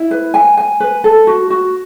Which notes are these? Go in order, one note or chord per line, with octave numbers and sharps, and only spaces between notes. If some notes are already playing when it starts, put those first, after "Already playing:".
Already playing: E4
B4
G#5
G#5
B4
A4
F#4
F#4